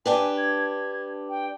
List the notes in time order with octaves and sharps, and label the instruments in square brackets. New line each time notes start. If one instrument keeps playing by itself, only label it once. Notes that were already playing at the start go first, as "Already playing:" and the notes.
[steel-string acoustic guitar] D4 G4 B4 [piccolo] G#5
[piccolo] G#6
G5